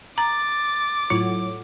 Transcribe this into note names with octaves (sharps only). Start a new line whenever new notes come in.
A#5 D6 A6
A2 F#3 F4